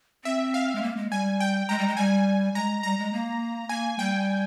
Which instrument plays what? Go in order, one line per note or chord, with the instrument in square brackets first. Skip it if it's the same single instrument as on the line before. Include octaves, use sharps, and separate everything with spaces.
[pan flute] C4 [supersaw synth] E5
[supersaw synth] F5
[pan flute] G#3
A#3
G#3
[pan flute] G3 [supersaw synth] G#5
[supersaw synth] G5
[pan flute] G#3 [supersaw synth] A#5
[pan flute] G3
G#3
[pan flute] G3 [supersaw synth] G#5
[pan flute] G#3 [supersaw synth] A#5
[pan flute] G3 [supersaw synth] A#5
[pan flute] G#3
A#3
[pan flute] A#3 [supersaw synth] G#5
[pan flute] G3 [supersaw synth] G5